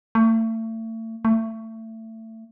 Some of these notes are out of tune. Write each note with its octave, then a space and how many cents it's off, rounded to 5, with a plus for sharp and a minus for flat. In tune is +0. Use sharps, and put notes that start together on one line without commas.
A3 +35
A3 +25